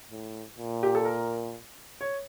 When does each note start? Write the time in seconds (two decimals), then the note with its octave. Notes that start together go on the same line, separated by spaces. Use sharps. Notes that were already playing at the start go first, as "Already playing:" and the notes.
0.11 A2
0.58 A#2
0.83 G4
0.95 A4
1.05 A#4
2.01 C#5